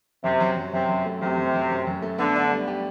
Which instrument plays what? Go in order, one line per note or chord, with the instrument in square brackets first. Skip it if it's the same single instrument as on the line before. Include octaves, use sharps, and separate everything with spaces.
[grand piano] F#2 [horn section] C3
[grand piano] F#3
F#2
[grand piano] F#2 [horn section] C3
[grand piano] F#2
A3
[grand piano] F#2 [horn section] C3
[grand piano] F#2
F#3
F#2
F#2
A3
[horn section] D3 [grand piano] B3
[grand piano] D4
G3
G4